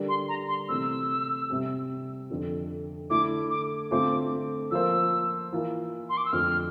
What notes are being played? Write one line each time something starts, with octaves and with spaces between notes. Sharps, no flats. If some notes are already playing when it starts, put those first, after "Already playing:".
Already playing: D3 G3 D4 G4 A#4
C6
A#5
C6
C3 E3 A3 C4 E6
C3 G3 C4 G4
F2 D3 F3
D3 A3 E4 D6
D6
D3 A3 C4 F4 D6
F3 A#3 F4 C5 E6
E3 A#3 F4 A#4
C6
D6
E6
F2 D3 F3 A3 F6